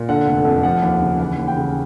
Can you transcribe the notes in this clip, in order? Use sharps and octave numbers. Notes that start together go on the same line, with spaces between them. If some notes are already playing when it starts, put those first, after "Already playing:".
Already playing: A#2
D3 F#5
F1
F2
F3 F#5
D#2
C#3
E3 F#5
D#2
G5
C#3